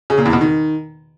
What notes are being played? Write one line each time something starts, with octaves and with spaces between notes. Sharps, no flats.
C#3
A#2
E2
B2
D#3